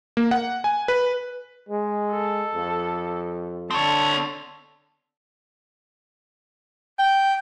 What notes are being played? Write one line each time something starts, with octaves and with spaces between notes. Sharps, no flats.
A#3
F#5
G#5
B4
G#3
A4
F2
D3 C4 C#5 A5
G5